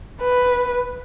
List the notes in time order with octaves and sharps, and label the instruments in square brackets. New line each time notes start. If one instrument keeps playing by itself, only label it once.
[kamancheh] B4